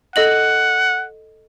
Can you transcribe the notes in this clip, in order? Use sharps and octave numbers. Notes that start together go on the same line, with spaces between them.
A4 D#5 F#5 F#7